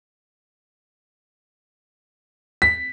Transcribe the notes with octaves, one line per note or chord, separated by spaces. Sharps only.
B6